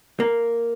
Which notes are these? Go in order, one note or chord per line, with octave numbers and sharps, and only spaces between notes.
A#3